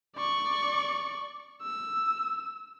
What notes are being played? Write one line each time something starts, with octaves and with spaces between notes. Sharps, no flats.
D5 C#6
E6